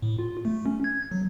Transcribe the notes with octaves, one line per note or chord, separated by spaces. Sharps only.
A2
F4
A3
C#4
G#6
F#3